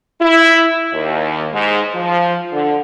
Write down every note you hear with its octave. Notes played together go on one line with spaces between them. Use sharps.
E4
D#2
G#2
F3
D3